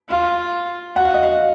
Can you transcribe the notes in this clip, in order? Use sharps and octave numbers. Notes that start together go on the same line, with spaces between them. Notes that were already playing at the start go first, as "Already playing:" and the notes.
F4 F5
F#4 F#5
F5
D#5
F5